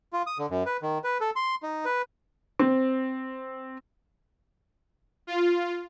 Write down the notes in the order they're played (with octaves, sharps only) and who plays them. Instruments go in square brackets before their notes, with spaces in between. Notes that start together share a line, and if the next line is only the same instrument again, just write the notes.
[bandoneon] F4
D#6
D3
F#2
B4
D#3
B4
A4
C6
D#4
B4
[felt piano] C4
[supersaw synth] F4